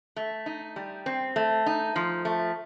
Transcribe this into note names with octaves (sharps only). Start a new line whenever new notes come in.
A3
D#4
G3
C4
A3
D#4
F3
A3